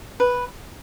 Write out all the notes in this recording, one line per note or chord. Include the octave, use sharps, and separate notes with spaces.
B4